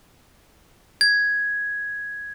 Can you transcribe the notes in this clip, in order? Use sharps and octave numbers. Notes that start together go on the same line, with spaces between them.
G#6